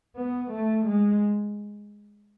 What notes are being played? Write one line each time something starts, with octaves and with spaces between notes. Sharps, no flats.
B3
A3
G#3